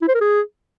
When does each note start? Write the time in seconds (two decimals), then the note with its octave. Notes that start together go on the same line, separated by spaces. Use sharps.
0.02 E4
0.08 C5
0.14 A#4
0.21 G#4